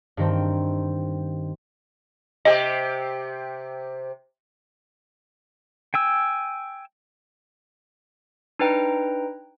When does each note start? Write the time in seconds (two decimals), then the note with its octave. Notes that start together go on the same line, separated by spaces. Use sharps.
0.17 G2 D#3 C4
2.45 C3 G4 D#5
5.94 G5 G#5 E6
8.59 D4 D#4 B4 G5 A#5